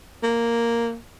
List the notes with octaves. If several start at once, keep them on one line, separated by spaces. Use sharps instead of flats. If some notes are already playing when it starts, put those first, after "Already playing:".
A#3